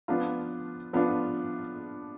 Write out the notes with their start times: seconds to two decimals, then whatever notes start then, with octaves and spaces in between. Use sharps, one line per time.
0.08 F3 B3 D4 F4
0.93 F3 B3 D4 F4